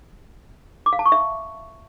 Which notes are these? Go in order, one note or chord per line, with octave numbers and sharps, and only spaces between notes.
D6
F5
A5
C#6
E5